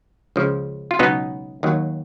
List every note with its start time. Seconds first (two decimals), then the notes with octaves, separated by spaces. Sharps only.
0.36 C#2 C#3 F3
0.91 F4
0.99 C#2 B2 F#3 B3 D#4
1.63 D#2 D#3 F#3